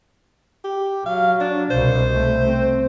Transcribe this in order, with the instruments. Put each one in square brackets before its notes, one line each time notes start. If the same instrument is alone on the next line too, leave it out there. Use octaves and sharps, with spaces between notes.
[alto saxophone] G4
[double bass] F#3 [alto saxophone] F5
[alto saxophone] D4
[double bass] C2 B2 [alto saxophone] C5
[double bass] C2 A3
C4